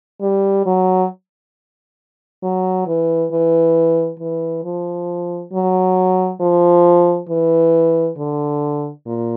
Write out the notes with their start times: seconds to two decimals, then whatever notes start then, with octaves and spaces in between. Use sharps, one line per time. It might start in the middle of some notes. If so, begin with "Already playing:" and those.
0.22 G3
0.66 F#3
2.43 F#3
2.87 E3
3.32 E3
4.19 E3
4.64 F3
5.52 F#3
6.40 F3
7.29 E3
8.18 D3
9.06 A#2